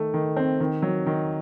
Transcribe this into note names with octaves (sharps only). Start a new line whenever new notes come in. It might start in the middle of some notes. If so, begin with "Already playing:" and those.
Already playing: D#3 A3
D#3
C4
D#3
F#3
D#3